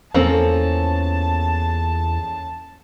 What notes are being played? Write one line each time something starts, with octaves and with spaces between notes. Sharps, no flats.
E2 F3 A#3 C4 C#4 A4 A5